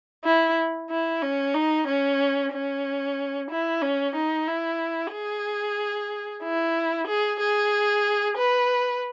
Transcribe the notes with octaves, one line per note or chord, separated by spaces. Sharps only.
E4
E4
C#4
D#4
C#4
C#4
E4
C#4
D#4
E4
G#4
E4
G#4
G#4
B4